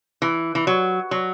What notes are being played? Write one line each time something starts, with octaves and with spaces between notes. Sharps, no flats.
E3
E3
F#3
F#3